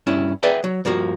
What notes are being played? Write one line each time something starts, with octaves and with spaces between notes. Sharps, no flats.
G2 C#4 E4
G#4 B4 D5 E5 F#5 G5
F#3
G2 F3 A#3 F#4